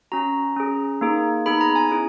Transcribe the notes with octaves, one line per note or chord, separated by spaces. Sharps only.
C#4 F#4 A#5
C#4 G#4
A#3 D#4 G#4
B3 D#4 G#4 B5
A#5
G#5
C#4 E4 G#4